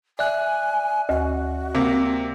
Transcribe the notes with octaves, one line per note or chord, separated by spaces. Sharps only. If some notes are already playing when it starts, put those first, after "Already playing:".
D5 E5 G#5 F#6
D2 F#4
C3 A#3